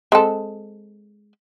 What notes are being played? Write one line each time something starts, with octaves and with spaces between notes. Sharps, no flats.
G#3 C4 A4